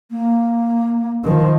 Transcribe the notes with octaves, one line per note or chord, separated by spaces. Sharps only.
A#3
D#3 F3